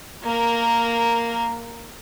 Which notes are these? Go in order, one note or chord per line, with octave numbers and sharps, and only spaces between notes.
A#3 A#4